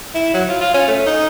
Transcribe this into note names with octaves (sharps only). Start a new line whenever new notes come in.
E4
F#3
F4
F4
C#4
A3
D#4